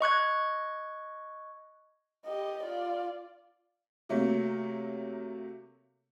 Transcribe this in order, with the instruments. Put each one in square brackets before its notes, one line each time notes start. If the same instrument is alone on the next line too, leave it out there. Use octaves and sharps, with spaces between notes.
[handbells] D#5 C#6 F#6 G#6
[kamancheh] G4 D#5
F4 D5
[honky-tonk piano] C3 F#3 A3 A#3